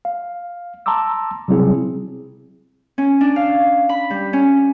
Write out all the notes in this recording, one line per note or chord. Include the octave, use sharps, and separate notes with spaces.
F5
A5 A#5 C6 D6 E6
C3 F#3 G3 C4 E4 G#4
C#4
D4
F5
B5
G3
C#4